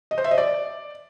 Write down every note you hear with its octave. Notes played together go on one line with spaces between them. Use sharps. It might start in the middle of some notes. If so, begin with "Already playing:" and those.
D#5
C5
E5
D#5
D5